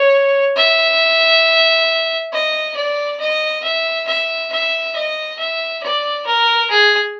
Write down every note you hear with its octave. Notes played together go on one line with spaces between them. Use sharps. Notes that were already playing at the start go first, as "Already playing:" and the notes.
Already playing: C#5
E5
D#5
D5
D#5
E5
E5
E5
D#5
E5
D5
A#4
G#4